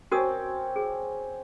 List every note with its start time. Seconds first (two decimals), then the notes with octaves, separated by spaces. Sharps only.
0.12 C4 C#4 F#4 A#4 D6 D#6
0.76 G#4